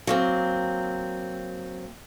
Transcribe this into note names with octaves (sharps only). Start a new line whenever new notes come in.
F#3 A#3 C4